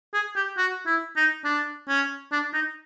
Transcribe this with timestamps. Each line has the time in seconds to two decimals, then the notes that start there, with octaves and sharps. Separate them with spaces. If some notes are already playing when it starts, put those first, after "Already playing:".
0.14 G#4
0.36 G4
0.58 F#4
0.87 E4
1.16 D#4
1.45 D4
1.88 C#4
2.32 D4
2.54 D#4